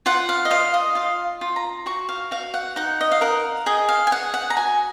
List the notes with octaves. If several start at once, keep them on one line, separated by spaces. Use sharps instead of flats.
F4 F#5
F5
D#5
F4 F5
D#5
F4 F5
F4
A#5
F#4 C#6
F5
F#4 F5
F#5
D#4 F#5
D#5
F5
A#4 F#5
G#4 D#5
F5
G#5
G#4 F#5
F#5
A#5
F#4 G#5